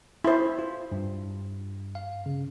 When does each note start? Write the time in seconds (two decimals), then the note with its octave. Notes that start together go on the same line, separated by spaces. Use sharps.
0.24 E4 C5
0.59 F4
0.92 G2
1.95 F5
2.26 C#3